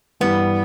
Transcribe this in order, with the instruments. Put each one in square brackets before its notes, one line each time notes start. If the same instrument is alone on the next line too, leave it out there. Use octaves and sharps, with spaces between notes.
[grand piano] G2 E3 G3 [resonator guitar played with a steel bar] B3